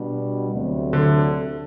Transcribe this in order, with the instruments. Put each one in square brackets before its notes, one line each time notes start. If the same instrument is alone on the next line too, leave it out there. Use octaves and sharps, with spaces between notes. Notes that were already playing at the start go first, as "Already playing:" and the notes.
Already playing: [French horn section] B2 G3 D4
D2 C3 F#3 A3
[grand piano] D3